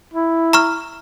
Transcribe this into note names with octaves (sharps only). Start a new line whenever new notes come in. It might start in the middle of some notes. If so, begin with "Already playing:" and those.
E4
A#5 C#6 F6